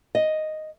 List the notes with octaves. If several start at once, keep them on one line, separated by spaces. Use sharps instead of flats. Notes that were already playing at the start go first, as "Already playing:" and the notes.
D#5